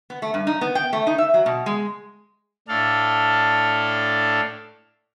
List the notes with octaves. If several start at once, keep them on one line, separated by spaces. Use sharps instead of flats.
B3
A3
G2
D#4
B3
G5
A3
D#4
E5
F#3
B2
G#3
A2 D4 A4 F5